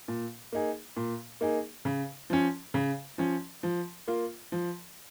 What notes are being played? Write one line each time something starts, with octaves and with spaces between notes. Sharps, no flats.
A#2
A#3 D#4 G#4
A#2
A#3 D#4 G#4
C#3
F3 C#4
C#3
F3 C#4
F3
A#3 F4
F3